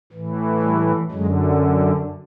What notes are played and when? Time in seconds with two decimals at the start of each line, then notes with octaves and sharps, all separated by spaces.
0.12 A2 E3
0.62 G3 A3
1.11 F#2 D3 F#3 G#3